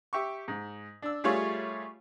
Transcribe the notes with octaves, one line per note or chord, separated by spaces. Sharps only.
G4 E5 C#6
G#2
D4 E6
G3 A3 F4 G#4 C#5